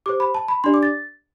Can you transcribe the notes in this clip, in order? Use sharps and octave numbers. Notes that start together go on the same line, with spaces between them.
G4 C5 D6
B5
A5
B5
D4 G4 D5 C6
D6
A6